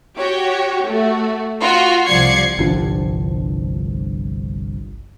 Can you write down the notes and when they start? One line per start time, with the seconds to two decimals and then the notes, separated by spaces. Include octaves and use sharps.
0.17 F#4 G4 C#5
0.86 A3 F#4
1.60 F4 F#4
2.06 C2 F3 D5 G#6 C7 C#7
2.59 G1 C2 F3 D4